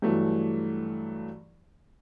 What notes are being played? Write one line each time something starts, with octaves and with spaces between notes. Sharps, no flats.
G2 E3 F#3 A3